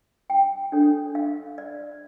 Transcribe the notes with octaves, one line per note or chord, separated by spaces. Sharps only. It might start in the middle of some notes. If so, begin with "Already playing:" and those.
G5
D4 A4 C#5
F5
D5